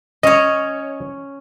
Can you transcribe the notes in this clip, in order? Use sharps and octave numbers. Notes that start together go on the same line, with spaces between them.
C#4 C#5 D#5